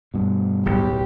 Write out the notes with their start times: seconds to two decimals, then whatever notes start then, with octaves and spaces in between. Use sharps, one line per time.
0.14 G2 B2
0.65 D1 B1 G4